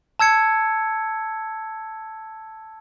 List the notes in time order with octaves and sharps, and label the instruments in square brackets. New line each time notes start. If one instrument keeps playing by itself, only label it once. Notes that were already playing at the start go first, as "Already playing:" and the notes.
[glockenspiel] A5 E6 G#6 C#7